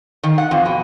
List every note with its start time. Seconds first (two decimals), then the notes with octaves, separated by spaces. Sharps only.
0.24 D#3
0.38 F#5
0.51 F2
0.65 B2